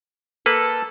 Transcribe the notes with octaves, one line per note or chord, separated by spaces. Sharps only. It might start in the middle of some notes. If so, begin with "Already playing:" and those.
A#3 A4 B4